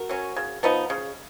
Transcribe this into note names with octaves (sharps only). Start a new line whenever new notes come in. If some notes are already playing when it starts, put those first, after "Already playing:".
Already playing: F#4 A#4
F#3 C#4
C#3
F3 B3 D#4
C#3